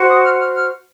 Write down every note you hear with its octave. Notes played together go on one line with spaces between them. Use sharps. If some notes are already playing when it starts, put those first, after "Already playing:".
Already playing: F#4 C5
D#6
F6
F6
F6